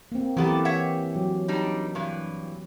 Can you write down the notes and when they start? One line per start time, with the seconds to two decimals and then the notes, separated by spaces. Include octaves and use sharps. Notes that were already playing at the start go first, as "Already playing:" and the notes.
0.12 A#3 C4
0.37 E3 F#3 B3 G4 A4
0.65 C#5 E5 F#5
1.16 F#3
1.48 G3 D4 D#4
1.95 G2 E3